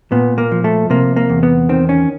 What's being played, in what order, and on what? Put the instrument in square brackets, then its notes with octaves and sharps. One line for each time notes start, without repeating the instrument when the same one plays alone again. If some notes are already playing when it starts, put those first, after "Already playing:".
[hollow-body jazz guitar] A#2 B3
A#3
F3
A3
C3 A#3
A#3
E2
B3
D#3 C4
C#4